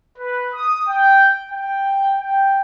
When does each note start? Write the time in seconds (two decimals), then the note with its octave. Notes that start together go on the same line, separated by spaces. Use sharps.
0.18 B4
0.54 D#6
0.88 G5
1.51 G5
2.19 G5